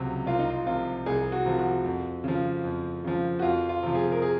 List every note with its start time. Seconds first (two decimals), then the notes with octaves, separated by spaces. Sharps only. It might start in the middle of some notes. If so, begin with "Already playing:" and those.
Already playing: C#2 C3 F#3
0.26 C2 F4
0.39 D#4
0.50 F4
0.66 C3 F3 F4
1.06 C2 G#4
1.32 F#4
1.45 C3 F3
1.59 F#4
1.84 F2
2.24 C#3 F3
2.64 F2
3.04 C#3 F3
3.39 F#4
3.42 F2 F4
3.69 F4
3.83 C3 F3
3.95 G#4
4.12 A#4
4.22 G#4